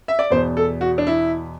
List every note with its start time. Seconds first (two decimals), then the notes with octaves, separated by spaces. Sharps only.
0.08 E5
0.19 D5
0.30 E2 B2 C5
0.57 A4
0.81 F#4
0.98 D4
1.07 E4